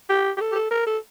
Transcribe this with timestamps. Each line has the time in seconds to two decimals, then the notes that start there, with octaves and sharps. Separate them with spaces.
0.10 G4
0.37 G4
0.41 A4
0.52 G4
0.55 A4
0.71 A#4
0.87 A4